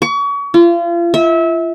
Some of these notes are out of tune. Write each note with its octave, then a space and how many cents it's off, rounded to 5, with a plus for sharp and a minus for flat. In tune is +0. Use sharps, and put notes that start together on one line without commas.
C#6 +35
F4 -35
E5 -25